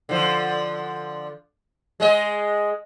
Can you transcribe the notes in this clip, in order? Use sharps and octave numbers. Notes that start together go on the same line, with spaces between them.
D3 F3
G#3 G#4 D#5